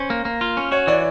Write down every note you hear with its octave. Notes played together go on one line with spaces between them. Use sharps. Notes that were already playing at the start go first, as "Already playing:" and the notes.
Already playing: C#4 C5
A#3
A#3
F4
C#4
F#4 C#5
E3 D5